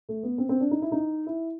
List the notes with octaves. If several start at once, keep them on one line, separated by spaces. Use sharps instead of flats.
A3
B3
C4
C4
D4
D#4
E4
D#4
E4